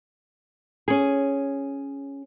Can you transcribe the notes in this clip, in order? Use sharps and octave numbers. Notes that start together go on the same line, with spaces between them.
C#4 G#4